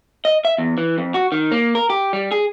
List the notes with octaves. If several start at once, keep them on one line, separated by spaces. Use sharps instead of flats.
D#5
E5
E2
E3
F2
F#4
D#3
A#3
A#4
G4
G3
G#4